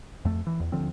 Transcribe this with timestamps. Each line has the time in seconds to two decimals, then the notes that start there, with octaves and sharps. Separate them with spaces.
0.25 F2 A3
0.47 E3
0.60 E2
0.72 D#1 D3 F3 C4